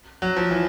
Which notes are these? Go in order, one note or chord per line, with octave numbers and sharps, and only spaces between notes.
F#3
F3
E3